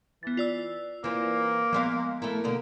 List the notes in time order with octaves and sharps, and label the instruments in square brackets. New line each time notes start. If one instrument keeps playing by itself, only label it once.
[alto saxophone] E3 [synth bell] B3 A6
[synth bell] F4 D5 E6
[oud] E3 C4 [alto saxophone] A#3
[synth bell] F3 B3 [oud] G#3 E5 F5
[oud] A3 E4 [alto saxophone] A#4
[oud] B2 D3 A#3